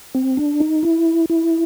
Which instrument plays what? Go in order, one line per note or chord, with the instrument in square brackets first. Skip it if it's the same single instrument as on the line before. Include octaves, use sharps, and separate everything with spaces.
[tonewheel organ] C4
D4
D#4
E4
E4